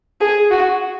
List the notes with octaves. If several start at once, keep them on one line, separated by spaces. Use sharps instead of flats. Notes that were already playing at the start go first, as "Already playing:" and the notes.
G#4
F#4